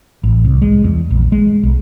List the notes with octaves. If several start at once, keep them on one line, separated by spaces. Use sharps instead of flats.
A1
C2
G#3
E2
A#1
G#3
B1